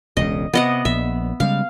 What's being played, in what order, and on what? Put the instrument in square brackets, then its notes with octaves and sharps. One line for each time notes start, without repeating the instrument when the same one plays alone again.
[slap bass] E1 C#2 C#3 [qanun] D#5
[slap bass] C3 [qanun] B3 D#5 F#5
[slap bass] A#1 [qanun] E5
[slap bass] C#3 G3 G#3 [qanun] F5